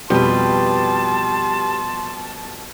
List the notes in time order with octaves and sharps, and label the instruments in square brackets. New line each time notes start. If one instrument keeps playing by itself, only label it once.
[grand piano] F2 B2 G3 [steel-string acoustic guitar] G4 B4 [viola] A5 [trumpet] C6